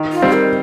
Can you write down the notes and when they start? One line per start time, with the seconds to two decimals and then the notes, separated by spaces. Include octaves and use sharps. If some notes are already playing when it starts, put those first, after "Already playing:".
Already playing: D#3
0.12 F4
0.22 G3 C4 D#4
0.32 A#4